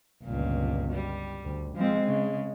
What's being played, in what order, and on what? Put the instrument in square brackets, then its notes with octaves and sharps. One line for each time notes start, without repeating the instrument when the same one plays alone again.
[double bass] G1 C#2 [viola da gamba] A#2
[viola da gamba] G3
[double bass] D2
[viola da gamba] F3 C4 [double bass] G#3
[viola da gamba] C#3